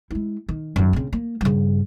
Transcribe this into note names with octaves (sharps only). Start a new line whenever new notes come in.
G#3 E4
D#3
F#2 D#3
C#3 C4
A#3
G2 C#3